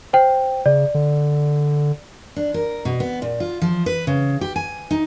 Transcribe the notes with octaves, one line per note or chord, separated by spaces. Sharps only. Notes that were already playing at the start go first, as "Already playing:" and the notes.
C5 G5
C#3 D5
D3
D4
A#4
B2
B3
A#2
F4
F3
B4
C#3
G4
G#5
D#4